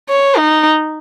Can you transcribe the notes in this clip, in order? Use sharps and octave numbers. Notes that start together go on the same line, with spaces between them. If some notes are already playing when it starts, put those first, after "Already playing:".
C#5
D#4